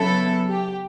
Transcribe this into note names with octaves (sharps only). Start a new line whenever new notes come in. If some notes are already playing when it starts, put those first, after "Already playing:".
Already playing: C#3 F#3 B3 E4 A4
G4